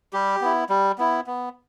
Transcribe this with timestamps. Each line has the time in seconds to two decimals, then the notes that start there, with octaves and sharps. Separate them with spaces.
0.13 G3 G4
0.41 B3 E4
0.69 G3
0.98 B3 E4
1.27 B3